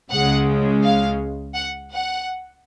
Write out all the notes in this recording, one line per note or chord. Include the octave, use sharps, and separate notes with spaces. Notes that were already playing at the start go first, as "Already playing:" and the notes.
C#2 C#3 G#3 F#5
F5
F#5
F#5